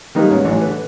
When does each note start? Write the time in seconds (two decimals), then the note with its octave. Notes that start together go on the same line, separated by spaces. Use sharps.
0.15 D#3 G3 A#3 D#4 B4
0.30 G#2 C#4
0.45 A1 E3 D4 C#5
0.61 D3 B4